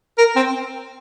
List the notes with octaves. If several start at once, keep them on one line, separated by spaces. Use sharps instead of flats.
A#4
C4